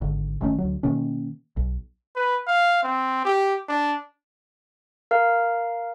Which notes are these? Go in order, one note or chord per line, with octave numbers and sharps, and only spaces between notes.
G#1 D3
G1 D#3 A3 C#4
D2 F#3
B2 D#3 A#3 C#4
B1
B4
F5
C4
G4
D4
A#4 F5 F6